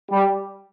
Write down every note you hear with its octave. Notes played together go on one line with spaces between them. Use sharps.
G3